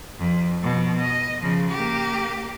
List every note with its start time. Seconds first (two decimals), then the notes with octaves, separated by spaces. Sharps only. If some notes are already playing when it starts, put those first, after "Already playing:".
0.18 F2
0.63 B2 F3
1.01 D#5
1.41 C#3 F3
1.71 A#3 G4